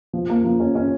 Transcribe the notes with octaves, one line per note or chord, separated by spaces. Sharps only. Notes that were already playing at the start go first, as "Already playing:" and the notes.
F3
A#3
F3
C#4
C#4